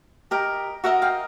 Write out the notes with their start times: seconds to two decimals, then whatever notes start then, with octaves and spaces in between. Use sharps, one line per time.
0.31 G4 A#4 D#5
0.84 F#4 A#4 D#5 E5 F#5
1.02 F5 G5